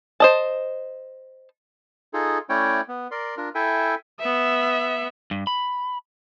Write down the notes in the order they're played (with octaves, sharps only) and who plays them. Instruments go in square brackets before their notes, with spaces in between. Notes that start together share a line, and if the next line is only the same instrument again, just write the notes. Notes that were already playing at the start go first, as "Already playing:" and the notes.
[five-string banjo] C5 D#5 A5
[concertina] D#4 F4 G#4 A4
A3 C#4 E4 C#5 D5 G5
B3
A#4 D5 C6
D4 F4 A#4
E4 A4 E5 G5 G#5
[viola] B3 E5
[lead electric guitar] G2
B5